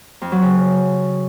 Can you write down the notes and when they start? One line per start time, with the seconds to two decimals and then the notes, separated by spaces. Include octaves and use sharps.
0.21 F2
0.32 F#3
0.42 C#3